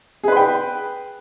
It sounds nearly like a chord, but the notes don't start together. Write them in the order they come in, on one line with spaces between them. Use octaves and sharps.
G#4 B4 B5 G5